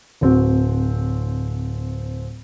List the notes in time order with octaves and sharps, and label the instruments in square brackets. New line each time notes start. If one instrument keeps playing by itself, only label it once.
[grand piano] D1 C4 F#4